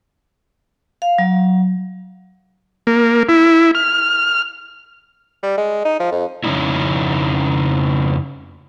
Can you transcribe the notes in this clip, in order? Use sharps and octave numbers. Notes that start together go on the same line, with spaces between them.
F5
F#3
A#3
E4
F6
G3
G#3
D#4
F3
F2
F2 C#3 F3 C#4 D#4 E4